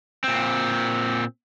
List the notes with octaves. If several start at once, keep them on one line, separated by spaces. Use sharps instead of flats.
A#2 C4